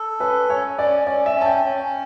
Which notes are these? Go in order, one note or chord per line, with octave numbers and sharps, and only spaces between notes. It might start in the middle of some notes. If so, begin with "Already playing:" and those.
Already playing: A4
C#4 B4
C#4 C#5
C#4 D5
C#4 D5
E5
C#4
A5
G5
C#4